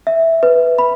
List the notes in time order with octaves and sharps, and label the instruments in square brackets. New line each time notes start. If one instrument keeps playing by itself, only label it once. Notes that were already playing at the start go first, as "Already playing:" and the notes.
[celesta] E5
B4
B5